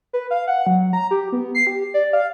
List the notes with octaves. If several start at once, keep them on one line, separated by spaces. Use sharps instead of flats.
B4
F5
F#5
F#3
A#5
G4
B3
C7
G4
D5
F5